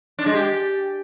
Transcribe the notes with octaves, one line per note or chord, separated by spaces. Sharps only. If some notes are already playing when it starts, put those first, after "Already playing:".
D4
G#3
G4